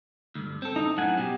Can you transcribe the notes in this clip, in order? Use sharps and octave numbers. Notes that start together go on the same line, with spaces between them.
D2 G2
C4 A4
D#4
F#2 A2 F#5 G#5
B2 G4